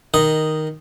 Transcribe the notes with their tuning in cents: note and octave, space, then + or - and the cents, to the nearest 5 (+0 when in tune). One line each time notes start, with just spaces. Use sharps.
D#3 +0 D#5 -5